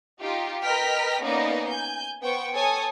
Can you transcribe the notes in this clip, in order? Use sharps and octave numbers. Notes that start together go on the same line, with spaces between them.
D#4 F4 G4
A#4 B4 D#5 G5 F6 B6
A#3 B3 C#4 D#4 D5 D#5
G#5 G6
B3 C5 G5 C#6
A4 C#5 G#5 D#6